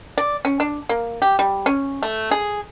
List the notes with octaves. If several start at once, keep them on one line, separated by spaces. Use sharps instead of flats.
D5
C#4
D4
A#3
G4
G3
C#4
A3
G#4